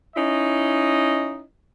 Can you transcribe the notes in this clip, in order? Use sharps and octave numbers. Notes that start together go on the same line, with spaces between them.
C#4 D#4 E4 D#5